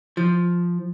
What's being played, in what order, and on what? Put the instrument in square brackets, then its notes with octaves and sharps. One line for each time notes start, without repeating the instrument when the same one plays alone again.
[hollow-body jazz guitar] F3